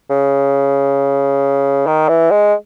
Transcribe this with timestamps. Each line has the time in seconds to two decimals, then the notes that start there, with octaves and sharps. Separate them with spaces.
0.09 C#3
1.87 D#3
2.08 E3
2.31 G#3